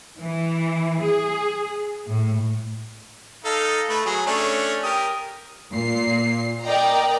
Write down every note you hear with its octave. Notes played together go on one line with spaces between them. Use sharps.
E3
G#4
A2
D#4 A4 F5
A3 B4
F#3 G#4
A3 C#4 D4
G4 A#4 D#6
A#2 C7
A#4 D5 D#5 G5 A#5